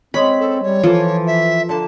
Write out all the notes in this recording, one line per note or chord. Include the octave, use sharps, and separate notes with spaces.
G#3 C4 C#4 B5
A4
G3 C#5
E3 F3 A#3 A4
E5
D3 A#3 A5